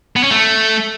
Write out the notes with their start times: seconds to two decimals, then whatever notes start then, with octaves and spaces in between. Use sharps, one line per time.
0.16 B3
0.23 C#4
0.31 A3